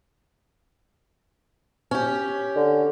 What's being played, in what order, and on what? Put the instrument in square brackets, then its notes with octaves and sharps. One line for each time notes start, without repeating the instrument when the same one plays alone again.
[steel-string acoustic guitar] C#4 G4
[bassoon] D3